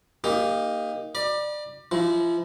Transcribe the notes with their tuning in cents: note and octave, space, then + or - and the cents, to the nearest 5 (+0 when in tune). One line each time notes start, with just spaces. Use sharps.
A#3 +0 D#4 +0 G4 +35
D5 +25 B5 -35
F3 -35 E4 -25